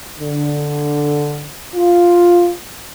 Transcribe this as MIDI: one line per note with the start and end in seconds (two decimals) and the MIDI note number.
0.20 1.46 50
1.76 2.50 65